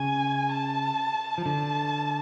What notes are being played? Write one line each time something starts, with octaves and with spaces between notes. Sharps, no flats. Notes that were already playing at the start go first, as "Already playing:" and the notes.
Already playing: C#3 G#5
A5
F3
D3 A5